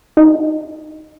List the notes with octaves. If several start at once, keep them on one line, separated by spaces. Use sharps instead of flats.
D#4